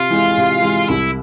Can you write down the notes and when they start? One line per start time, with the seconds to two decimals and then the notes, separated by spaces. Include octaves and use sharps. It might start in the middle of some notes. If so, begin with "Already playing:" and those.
Already playing: C3 F4
0.10 E3 G#3
0.38 C3
0.62 E3 G#3
0.89 C2 E4